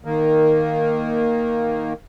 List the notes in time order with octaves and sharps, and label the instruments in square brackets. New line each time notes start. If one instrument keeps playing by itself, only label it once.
[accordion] D#3 A#3